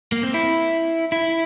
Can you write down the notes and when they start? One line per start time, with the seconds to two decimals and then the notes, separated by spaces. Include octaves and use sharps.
0.12 A#3
0.23 C4
0.34 E4
1.12 E4